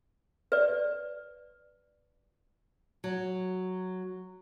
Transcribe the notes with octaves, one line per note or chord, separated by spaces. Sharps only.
B4 D5
F#3